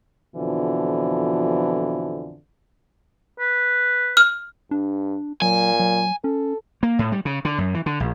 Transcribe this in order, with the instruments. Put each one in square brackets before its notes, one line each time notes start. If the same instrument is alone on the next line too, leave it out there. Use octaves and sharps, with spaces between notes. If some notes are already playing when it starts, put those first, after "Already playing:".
[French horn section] F2 B2 D3 E3 F3
[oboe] B4
[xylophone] F6
[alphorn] G2 [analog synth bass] D4
[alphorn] A#2 [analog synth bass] F#3 [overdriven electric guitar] G#5
[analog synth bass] F#3
[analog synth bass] C#4 [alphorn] A4
[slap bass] A#3
A2
G3
C#3
D3
F#2
E3
D3
A#1